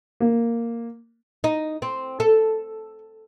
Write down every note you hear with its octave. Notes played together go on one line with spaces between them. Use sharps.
A#3
D#4
C4
A4